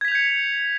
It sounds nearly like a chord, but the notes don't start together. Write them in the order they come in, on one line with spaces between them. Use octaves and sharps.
G#6 B6 F7 G6 C#7